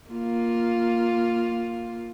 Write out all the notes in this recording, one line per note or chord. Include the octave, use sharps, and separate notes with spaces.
A#3 F4